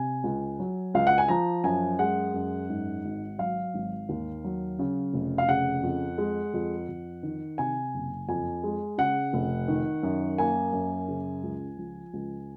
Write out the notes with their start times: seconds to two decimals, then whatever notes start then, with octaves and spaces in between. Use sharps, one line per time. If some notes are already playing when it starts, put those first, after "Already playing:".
Already playing: C3 G#5
0.24 C#2
0.60 F#3
0.94 C#2 F5
1.07 F#5
1.18 G#5
1.28 F3 A#5
1.64 F#2 G#5
1.99 G#3 F#5
2.34 F#2
2.70 G#2
3.04 G#1
3.39 F#3 F5
3.74 G#1
4.09 D#2
4.44 F#3
4.79 C#3
5.14 F1
5.38 F5
5.48 C#3 F#5
5.83 F2
6.18 G#3
6.54 F2
6.89 F2
7.23 D#3
7.58 C3 G#5
7.94 F#1
8.29 F2 G#5
8.64 G#3
8.98 C#3 F#5
9.33 F1
9.68 D#3
10.03 F#2
10.38 A#3 G#5
10.73 F#2
11.08 C#3
11.43 C#2
11.78 F3
12.13 C#2